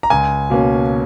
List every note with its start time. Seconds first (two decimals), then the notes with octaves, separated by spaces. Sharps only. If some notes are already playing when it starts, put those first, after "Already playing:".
0.03 A#5
0.10 C#2 G#5
0.50 B2 A#3 C#4